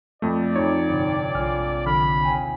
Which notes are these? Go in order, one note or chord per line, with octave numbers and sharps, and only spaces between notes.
F2 A3 D5
F2 D#4 F#4 C#5
G1 C2
A#1 G#3 F4 G#5 F6
A#1 D3 B5 F6
D#2 G5 G#5